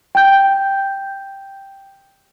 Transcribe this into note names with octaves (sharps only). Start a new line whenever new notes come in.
G5 G6